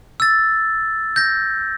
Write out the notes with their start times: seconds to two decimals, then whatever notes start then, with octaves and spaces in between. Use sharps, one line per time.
0.20 E6 A6
1.16 G6 A#6